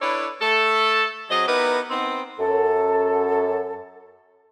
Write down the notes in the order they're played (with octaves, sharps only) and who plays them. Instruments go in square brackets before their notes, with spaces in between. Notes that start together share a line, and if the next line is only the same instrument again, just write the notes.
[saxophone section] D4 E4 A4 B4 C#5 D5
A3 A4
F#3 C4 G#4 D#5
B3 D#4 E4 G4 A#4 B4
B3 C4 D#4
[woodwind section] F#2 A4